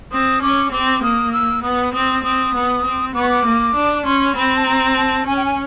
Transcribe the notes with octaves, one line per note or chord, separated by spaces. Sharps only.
C4 D#6
C#4 D6
C4 D6
A#3 D#6
E6
B3 D#6
C4 D#6
C4 D#6
B3
C4
B3 D6
C#6
D6
A#3
D4
C#4 C6
C4 B5
A5
A#5
A5
C#4 G#5
G5
G#5